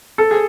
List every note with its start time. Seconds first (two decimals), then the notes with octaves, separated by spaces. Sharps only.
0.18 A4
0.31 G#4